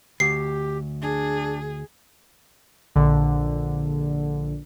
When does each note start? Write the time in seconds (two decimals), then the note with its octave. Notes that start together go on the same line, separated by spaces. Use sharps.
0.20 D2 G4 C7
1.02 D4 G#4
2.95 A#1 D3